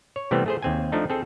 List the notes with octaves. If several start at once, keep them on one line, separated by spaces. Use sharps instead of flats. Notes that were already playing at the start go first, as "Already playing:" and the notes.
C#5
C3 E3 G3 A3 B3 C4
A3 G#4 C5
D#2 C4 G#5
F3 A3 D4 D#4
C4 G#4 A4